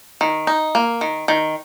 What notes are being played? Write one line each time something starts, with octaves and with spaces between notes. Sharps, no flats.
D#3
D#4
A#3
D#3
D#3